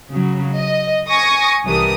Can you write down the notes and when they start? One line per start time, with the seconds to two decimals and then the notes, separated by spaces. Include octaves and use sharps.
0.11 C#3 F#3
0.55 D#5
1.08 G#5 C#6 D#6 A#6
1.65 C2 E3 D4 G4 A#4 D#6